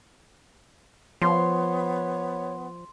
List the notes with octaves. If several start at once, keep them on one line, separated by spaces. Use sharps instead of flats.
F3 B3 C#5 C6